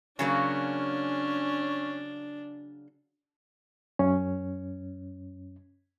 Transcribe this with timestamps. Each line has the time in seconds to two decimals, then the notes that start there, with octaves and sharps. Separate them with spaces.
0.19 C#3 F#3 A#3 C#4 D4
3.99 F#2 C#4